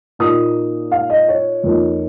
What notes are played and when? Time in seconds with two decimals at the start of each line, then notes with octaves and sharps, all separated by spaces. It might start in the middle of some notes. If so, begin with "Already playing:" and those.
0.19 A#2 A#3 D#4 D#6
0.92 F5
1.10 D#5
1.28 C#5
1.63 F2 F3 A#3 D#4